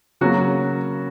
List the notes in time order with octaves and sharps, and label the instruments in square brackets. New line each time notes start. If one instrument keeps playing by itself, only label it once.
[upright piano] C#3 F#3 A#3 F#4